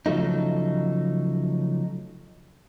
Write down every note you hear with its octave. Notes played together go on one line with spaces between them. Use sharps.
C#3 F3 F#3 A3 D#4